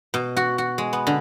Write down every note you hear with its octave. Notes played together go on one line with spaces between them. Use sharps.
B2
F#4
F#4
G#3
B3
D3